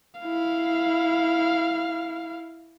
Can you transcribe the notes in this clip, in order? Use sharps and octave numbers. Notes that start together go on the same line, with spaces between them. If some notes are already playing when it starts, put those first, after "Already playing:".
E4 F5